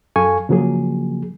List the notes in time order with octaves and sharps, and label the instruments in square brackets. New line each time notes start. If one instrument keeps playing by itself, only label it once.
[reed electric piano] F#2 A4 F5 G#5 C#6
C#3 F3 F#3 A#3 G#4